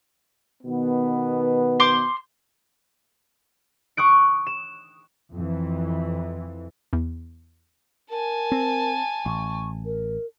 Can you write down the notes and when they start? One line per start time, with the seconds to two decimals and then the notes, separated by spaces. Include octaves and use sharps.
0.63 B2 D#3 B3
1.80 C5 C6 D6
3.97 C#6 D#6 F#6 D7
4.47 E7
5.35 F2 E3
6.93 E2
8.10 A#4 G#5 A5
8.52 C4
9.26 A1 C#6
9.85 A#4